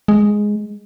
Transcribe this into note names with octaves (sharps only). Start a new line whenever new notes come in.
G#3